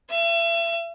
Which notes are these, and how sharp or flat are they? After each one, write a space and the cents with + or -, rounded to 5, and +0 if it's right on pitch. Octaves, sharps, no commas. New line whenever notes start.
E5 +40